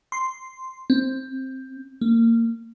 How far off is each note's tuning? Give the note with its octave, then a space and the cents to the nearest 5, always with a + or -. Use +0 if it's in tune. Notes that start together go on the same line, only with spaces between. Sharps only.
C6 -5
C4 +10
A#3 -25